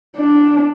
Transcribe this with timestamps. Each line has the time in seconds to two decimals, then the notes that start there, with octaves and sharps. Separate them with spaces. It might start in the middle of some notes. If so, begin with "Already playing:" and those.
0.17 D4